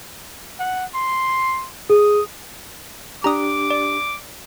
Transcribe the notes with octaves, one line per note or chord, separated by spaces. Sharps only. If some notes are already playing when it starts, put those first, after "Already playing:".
F#5
C6
G#4 D#6
D4 G4 A#5 D6 D#6
D5